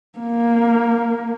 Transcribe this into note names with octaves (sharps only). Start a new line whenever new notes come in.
A#3